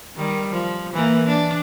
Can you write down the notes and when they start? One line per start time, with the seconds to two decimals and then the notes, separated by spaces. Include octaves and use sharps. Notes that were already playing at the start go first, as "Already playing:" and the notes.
0.16 D#3 G3
0.49 F3
0.94 E3 A#3
1.27 D4